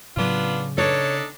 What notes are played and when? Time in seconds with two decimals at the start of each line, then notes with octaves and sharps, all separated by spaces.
0.17 A2 C#3 F#3 B3 D4 F4
0.78 D4 D#4 A4 C#5